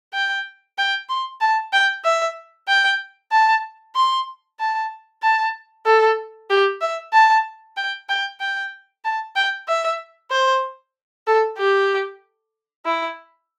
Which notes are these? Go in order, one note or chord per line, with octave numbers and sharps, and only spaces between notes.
G5
G5
C6
A5
G5
E5
G5
A5
C6
A5
A5
A4
G4
E5
A5
G5
G5
G5
A5
G5
E5
C5
A4
G4
E4